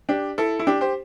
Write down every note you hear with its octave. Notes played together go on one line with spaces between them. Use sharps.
D4 G4
E4 A4
E4
D4 G4
G4 C5